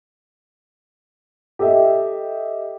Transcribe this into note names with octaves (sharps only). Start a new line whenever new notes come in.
G4 A4 D#5 E5